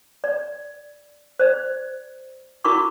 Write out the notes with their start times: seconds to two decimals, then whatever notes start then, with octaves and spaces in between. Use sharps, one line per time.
0.24 D5
1.39 C5 D5
2.64 E4 F#4 A#4 B5 C#6 D6